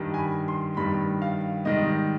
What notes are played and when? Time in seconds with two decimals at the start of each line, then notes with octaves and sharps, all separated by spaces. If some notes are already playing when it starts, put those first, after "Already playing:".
Already playing: G2 D#3 G3
0.14 G#5
0.18 B5
0.48 C6
0.77 G2 D#3 G3 B5
1.22 F5
1.65 G#2 D#3 G3 D#5